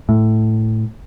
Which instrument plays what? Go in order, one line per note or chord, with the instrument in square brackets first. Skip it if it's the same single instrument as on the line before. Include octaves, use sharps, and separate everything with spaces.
[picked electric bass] A2